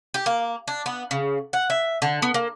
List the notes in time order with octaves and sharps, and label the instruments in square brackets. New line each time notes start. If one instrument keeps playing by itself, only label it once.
[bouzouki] G4
A#3
D4
B3
C#3
F#5
E5
D3
B3
A#3